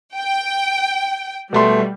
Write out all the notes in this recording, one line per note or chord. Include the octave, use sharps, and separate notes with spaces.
G5
B2 G3 A3 C6